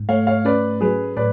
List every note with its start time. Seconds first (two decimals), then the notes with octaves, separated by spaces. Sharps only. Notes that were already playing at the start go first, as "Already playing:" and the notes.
Already playing: G#2
0.09 A3 C#5 F5
0.27 C#5 F5
0.45 C#4 B4 D5
0.81 F#3 G#4 B4
1.17 A2 B4 D5